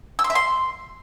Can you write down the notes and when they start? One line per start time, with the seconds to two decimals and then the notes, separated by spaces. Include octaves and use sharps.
0.19 E6
0.24 C6
0.30 E5
0.35 C6